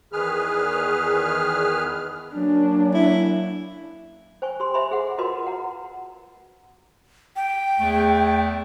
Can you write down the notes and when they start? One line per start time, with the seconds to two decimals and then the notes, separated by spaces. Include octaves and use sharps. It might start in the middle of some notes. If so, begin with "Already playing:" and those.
0.12 E2 D#3 G#4 B4 F6
2.35 F#3 A#3 C#4 D4
2.94 E4
4.42 C5 G5 G#5 C#6
4.60 G4 C6
4.74 C5 D#5 E5 G#5 B5 C6
4.91 G#4 F#5
5.18 F4 F#4 A#4 B4 D#5 C6
5.47 F#5 A#5
7.36 G5
7.80 E2 A3